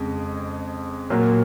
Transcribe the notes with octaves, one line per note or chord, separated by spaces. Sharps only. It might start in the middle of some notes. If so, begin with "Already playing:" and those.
Already playing: F2 C#3 G#3
A#2 F#3 A#3